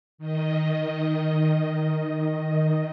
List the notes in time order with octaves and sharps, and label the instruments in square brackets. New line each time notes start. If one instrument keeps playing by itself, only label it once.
[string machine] D#3 D#5